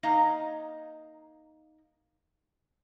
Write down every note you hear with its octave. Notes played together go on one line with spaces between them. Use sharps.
A#3 D#4 D#5 F5 A#5